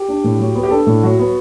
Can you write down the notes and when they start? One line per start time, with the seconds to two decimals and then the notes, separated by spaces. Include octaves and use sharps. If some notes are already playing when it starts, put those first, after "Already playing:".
Already playing: G4
0.08 D4
0.24 A2
0.39 F#3
0.55 B3
0.63 G4
0.70 D4 A4
0.87 A2
1.03 F#3 F#4
1.19 B3